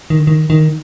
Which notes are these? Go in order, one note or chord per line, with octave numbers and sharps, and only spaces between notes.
D#3
D3
D#3
D#3